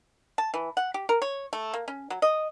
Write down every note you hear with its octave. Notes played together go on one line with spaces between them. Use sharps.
A5
E3
F#5
G4
A#4
C#5
A3
A#3
C#4
F#3
D#5